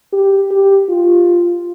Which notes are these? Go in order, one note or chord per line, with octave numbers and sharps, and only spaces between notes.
G4
G4
F4